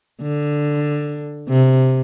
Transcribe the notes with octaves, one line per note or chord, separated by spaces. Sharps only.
D3
C3